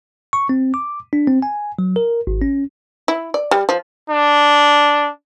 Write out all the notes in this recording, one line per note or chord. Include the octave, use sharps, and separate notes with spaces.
C#6
C4
D6
D4
C4
G#5
F#3
A#4
G#1
C#4
E4
D5
G3
F3
D4